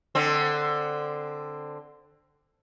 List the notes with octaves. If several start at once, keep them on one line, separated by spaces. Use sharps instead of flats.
D3 C4